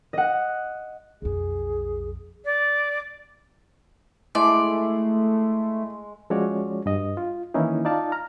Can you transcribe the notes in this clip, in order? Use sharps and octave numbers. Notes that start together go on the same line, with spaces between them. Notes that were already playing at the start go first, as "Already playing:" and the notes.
D#5 F#5
B1 F2 G#4
D5
G#3 A3 E4 D5
F3 G#3 C#4 F#4 C#5 D5
G2 D#5
F4
D#3 E3 A#3 C#4 D#4 E4
D#4 F4 D5 F5 A5
A#5 F6